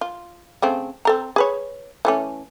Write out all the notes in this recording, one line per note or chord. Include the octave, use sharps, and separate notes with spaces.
F4
C#3 A3 C4
C4 A4 A#5
G#4 B4 C#5
E3 A3 C#4